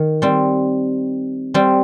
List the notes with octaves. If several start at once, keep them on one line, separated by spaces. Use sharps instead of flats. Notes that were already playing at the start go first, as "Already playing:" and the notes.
Already playing: D#3
G3 C4
G3 C4